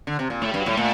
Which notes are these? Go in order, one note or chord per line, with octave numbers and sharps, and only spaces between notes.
D3
C3
A#2
A2 A3
G2 G3
F#3
A2 G3
A#2 A3